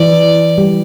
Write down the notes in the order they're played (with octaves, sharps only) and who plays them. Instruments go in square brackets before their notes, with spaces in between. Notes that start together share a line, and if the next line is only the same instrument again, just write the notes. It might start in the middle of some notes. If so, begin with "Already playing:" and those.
Already playing: [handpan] E3 [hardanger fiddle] D5
[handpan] G3